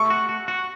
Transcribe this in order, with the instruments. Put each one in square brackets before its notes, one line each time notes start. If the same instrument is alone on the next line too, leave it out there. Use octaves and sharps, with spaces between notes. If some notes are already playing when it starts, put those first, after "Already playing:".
Already playing: [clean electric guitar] A3 [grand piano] C#6
[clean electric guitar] F#4
F#4
F#4